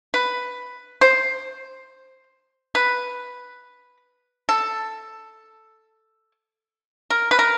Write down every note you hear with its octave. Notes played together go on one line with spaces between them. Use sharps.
B4
C5
B4
A4
A#4
B4
A#4